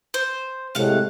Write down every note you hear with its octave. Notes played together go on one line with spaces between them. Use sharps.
C5
A2 C3 G#3 F5 F#5